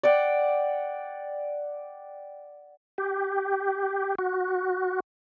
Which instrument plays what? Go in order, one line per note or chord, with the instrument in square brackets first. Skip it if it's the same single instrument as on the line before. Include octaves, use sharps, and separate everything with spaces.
[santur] D5 F#5 G5
[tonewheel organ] G4
F#4